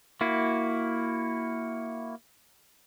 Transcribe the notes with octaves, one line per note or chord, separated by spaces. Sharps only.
A#3 E4 F#4